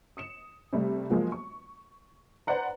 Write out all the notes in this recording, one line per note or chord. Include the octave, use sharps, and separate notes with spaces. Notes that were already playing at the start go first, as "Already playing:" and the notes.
D#6 C#7 E7
C3 G3 A3
F3 F#3 G#3 A#3 F#4
C#6
B4 C5 D5 F#5 A#5